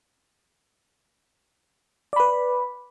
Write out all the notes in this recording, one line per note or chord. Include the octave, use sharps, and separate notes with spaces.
B4 D5 B5